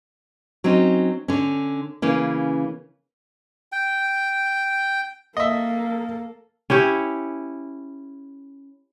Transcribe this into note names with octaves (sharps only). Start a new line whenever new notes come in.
F#3 C4 C#4 D#4
D3 C#4
C#3 E3 A#3 C#4
G5
A#3 A4 D#5 E5
C#4 E4 G4 C#5